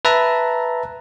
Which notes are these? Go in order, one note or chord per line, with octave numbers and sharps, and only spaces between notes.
B4 E5 A5 A#5